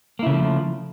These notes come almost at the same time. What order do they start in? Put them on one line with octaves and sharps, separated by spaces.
A#3 E4 C#3 A3 F3